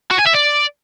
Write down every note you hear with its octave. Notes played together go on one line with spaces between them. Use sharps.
F#4
G#5
E5
D5